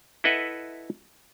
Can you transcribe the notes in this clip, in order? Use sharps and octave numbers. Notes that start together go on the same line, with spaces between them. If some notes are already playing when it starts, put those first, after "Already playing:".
E4 A4 B4 D#5 E5 F#5